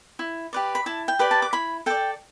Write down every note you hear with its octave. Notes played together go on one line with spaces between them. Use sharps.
E4
G4 B4 D5
B5
E4 A5
G5
G4 B4 D5
A5
D6
E4 B5
A4 D5 G5